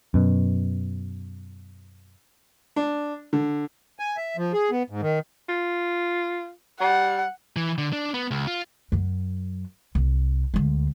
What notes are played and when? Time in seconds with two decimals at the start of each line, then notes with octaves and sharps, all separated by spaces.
0.14 F#2 B2
2.76 D4
3.33 D3
3.99 G#5
4.17 E5
4.37 F3
4.53 G#4
4.71 B3
4.90 G#2
5.02 D#3
5.49 F4
6.81 G3 F#5
7.56 E3
7.78 D3
7.93 D4
8.14 B3
8.31 C#2
8.47 F4
8.92 F#2 F#3
9.95 C2
10.54 D2 G#3